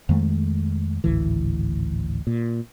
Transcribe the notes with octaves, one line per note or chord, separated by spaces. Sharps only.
F2 D#3 G#3 A3
G#1 D2 A2 E3
A#2